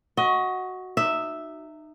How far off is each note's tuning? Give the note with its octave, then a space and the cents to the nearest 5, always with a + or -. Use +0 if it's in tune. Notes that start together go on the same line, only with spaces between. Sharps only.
F#4 +0 D#5 +25
D#4 -25 E5 +0